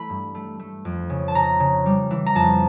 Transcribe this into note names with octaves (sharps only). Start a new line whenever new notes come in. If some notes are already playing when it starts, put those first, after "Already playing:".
Already playing: E3 A3 B5
G2
A3
A3
F2
C#3
A5
C#3 A#5
C#3
G3
E3
A#5
F2 A5